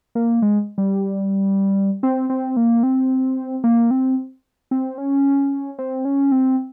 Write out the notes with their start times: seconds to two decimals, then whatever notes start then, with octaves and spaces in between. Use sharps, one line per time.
0.15 A#3
0.42 G#3
0.78 G3
2.03 C4
2.30 C4
2.57 A#3
2.83 C4
3.64 A#3
3.91 C4
4.71 C4
4.98 C#4
5.78 C4
6.05 C#4
6.32 C4